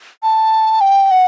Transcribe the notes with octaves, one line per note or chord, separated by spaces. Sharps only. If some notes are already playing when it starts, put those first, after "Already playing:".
A5
G5
F#5